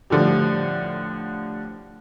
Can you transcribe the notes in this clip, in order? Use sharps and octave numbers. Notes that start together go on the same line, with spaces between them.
A2 D3 F3 G3